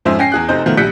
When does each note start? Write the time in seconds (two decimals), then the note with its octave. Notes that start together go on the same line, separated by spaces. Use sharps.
0.05 F2 G#2 F3 C#4 C5 E5
0.19 C#4 G5 A#6 C7
0.32 E2 G#4 F#6
0.49 F1 C3 D#4 C5 G6
0.66 B2 D#3 F3 A3 B3
0.77 A#1 G3 F#6 G6 B6 C#7